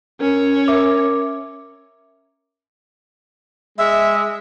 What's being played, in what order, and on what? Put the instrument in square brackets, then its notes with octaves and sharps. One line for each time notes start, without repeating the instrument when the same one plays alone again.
[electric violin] C#4 C#5 [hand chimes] A#4
[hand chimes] A#4 E5 D6
[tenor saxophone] G#3 [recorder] E5